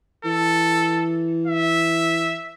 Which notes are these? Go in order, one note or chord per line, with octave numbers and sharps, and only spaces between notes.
E3 A4
E5